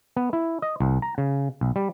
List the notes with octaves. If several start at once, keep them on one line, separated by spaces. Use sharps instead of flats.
B3
E4
D#5
C2
A#5
C#3
B1
G3